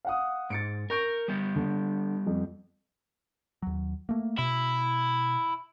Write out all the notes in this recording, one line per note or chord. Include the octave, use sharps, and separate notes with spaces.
F5 F#5 D#6
G#2 A6 C#7 D7
A#4 C#6 G6 D7
G3 B3
D3
F2
D#2 F#3
A3 A#3
B2 E4